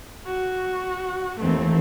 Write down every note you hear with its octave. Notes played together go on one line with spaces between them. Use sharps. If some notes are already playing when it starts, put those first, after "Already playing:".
F#4
D#2 E3 A3 C4